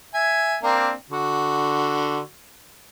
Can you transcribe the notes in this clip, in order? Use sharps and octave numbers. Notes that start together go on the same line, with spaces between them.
E5 G#5
A#3 C4 D4
D3 F#4